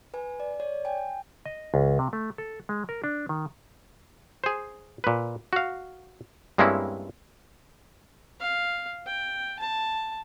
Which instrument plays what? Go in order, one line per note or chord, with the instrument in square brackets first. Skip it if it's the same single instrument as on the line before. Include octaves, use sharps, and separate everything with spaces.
[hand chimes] B4 G#5
D5
C#5 D5
G5 G#5
[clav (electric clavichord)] D#5
C#2
C3
A3
A4
G#3
A#4
D4
D#3
G#4 C5
A#2 B4
F#4 F5
G2 G#3 A#3 C4 C#4 E4
[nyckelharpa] F5
G5
A5